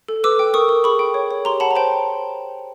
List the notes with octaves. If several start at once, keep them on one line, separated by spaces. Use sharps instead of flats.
A4
B4 D6 E6
G5
A#4 C#6 D#6
A#4
G#4 B5 C#6
G5
C#5
C#5
G4 A#5 C6
F#5 A5 B5
A#5
C5 G5 A5